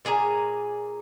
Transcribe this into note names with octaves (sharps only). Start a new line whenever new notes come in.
A#2 G#4 G#5 A#5